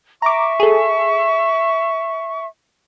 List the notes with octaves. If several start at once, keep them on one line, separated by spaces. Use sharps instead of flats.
E5 A#5 C#6 D6
G#4 A4